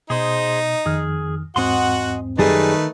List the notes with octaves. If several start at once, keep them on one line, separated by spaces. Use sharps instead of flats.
B2 D#4 G#4 C5
F2 D#3 G#4 F6
E2 G#2 C4 F#4 D#5 F#5 G#5 C6
F#2 D#3 G3 A3 D#4 G#4 B4 A5